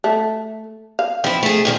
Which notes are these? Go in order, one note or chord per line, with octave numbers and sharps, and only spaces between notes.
A3
F5
F3 C4 E4
A3 G#4
A#2 D#3 F3